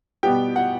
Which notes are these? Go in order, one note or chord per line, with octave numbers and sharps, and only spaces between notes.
B2 G3 B3 G4 G5
F#5